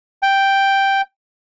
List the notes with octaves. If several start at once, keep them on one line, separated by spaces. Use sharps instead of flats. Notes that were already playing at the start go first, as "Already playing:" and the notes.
G5